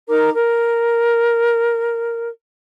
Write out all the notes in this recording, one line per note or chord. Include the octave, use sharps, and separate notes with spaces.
D#4 A#4 A#5 D6
A#4